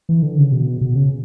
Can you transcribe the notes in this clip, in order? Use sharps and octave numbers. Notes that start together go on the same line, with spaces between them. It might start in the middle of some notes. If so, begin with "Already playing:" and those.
E3
D3
C#3
B2
B2
C#3